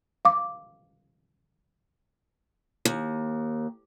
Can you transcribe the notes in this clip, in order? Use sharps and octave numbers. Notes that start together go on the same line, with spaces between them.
F5 D6
D#2